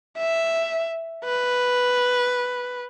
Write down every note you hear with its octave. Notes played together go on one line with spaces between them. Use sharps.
E5
B4